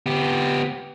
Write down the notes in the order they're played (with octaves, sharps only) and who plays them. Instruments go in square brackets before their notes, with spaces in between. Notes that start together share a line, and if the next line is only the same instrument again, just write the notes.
[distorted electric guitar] B3 G4